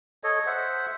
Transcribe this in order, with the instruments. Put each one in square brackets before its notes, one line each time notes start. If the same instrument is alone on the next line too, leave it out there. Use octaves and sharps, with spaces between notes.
[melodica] A4 C#5 D#5
C5 E5 F#5